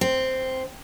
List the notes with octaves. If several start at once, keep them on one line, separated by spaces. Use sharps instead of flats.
C4